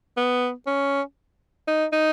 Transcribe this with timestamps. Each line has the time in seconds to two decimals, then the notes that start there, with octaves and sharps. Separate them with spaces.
0.17 B3
0.66 C#4
1.68 D#4
1.93 D#4